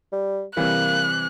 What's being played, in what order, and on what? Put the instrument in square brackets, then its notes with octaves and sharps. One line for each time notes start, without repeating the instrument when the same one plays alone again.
[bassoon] G3
[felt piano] C3 E3 G3 [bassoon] A#3 [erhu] F#6